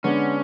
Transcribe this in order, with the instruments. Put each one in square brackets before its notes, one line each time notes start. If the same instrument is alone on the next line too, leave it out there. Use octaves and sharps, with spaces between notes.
[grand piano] D3 G#3 B3 D4 [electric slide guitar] C#4